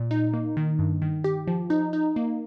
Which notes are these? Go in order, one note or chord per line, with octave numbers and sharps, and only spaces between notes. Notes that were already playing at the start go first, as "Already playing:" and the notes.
Already playing: A#2
D#4
A#3
D#3
G2
D#3
G4
F3
D#4
D#4
A#3